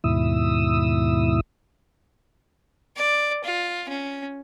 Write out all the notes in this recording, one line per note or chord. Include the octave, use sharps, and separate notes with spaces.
D#2 G#2 B2 E4 D#6 E6
D5
F4
C#4